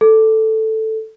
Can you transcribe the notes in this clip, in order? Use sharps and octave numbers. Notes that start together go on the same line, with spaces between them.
A4